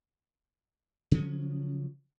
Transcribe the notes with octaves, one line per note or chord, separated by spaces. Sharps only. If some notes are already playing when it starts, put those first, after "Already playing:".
C#3 F3 F#3 C#4